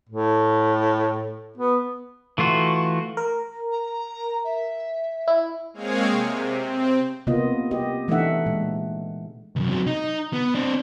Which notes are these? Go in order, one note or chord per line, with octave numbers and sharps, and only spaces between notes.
A2
B3
E3 A3 F4 F#4
A#4
A#5
E5
E4
G#3 A#3 C4 G#4 C#5 F5
C3
C4
C3 A#3 B3 F4 D#5
G4 D#5
E3 A3 D4 D#4 E5 F#5
A#2 G#3
C#2 F#2
C3 F#3
D#4
B3
C4 D4